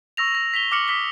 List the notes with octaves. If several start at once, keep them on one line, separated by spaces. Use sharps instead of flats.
C#6 E6 A#6 F7
A#6
B6 F7 G7
D6 F6 C#7 F#7
D#6 B6 G7